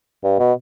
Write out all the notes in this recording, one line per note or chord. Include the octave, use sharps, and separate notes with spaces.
G2
B2